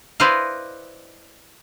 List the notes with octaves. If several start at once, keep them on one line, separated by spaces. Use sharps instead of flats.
E4 B4 C5 D5 D#5 F5